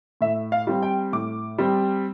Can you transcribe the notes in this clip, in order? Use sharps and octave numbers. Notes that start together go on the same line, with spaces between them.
A2 E5
F5
G3 C4
G5
A2 D6
G3 C4